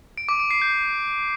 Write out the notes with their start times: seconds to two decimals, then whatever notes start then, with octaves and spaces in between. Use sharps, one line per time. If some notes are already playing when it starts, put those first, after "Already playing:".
0.18 D7
0.29 D6
0.40 D7
0.51 C7
0.62 G6